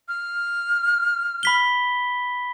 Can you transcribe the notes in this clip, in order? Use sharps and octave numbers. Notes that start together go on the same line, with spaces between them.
F6
B5 B6 G7